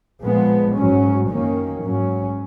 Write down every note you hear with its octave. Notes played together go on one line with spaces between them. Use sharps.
A#2 F3 G#3 B3
G#2 F#3 C#4
F#2 D#3 A#3 C#4
G#2 F#3 C#4